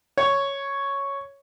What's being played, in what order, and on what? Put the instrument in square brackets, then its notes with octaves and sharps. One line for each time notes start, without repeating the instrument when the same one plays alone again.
[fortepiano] C#5